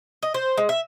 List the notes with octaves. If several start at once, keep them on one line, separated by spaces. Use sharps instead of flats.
D#5
C5
G#3
E5